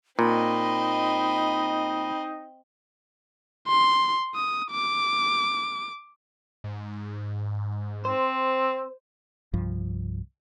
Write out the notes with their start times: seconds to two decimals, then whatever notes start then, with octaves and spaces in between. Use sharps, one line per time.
0.19 A#2 C4 D#4 D#5 B5
3.68 C6
4.35 D#6
4.71 D6
6.64 G#2
8.05 C4 C5
9.54 C2 G2 F3